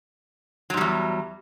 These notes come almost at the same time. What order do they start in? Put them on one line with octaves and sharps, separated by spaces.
F#3 G#2 G3 E2